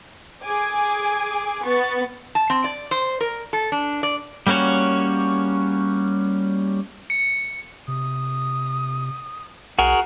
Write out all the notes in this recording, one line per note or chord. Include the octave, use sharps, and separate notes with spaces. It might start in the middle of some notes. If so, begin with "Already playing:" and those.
G#4 G#5 D6
B3 C#6 A6
A5
C4
D5
C5
A#4
A4
D4
D5
G3 A#3 C#4 F#4 C#5
C#7
C3 D#6
B1 F#4 G#4 A#4 F#5